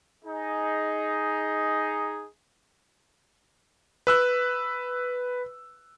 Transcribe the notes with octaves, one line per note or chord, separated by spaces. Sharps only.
D#4 G#4
B4 E6 F#6